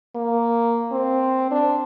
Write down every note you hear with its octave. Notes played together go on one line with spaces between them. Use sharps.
A#3
C4
D4